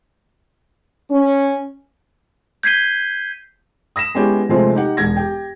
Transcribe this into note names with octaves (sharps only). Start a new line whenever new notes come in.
C#4
G6 G#6 B6 C7 D#7 G7
D#6 A#6 B6 E7
G#3 B3 C#4 E4 G4
C3 F3 G#3 A3 C4
D#4 G4 F#5
E1 G#6 A#6
G4 G5